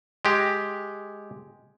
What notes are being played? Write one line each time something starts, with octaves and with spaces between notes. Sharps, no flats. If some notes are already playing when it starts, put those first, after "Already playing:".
G#3 G4